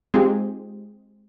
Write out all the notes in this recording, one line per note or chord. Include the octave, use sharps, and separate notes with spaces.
G#3 C4 D#4 F4 G4 G#4